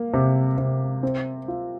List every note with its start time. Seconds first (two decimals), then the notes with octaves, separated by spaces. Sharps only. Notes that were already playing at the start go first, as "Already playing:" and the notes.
Already playing: A#3
0.14 C3
0.58 C3
1.03 C4
1.48 F4